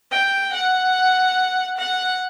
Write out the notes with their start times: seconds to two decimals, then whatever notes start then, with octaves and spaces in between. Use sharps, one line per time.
0.11 G5
0.53 F#5
1.77 F#5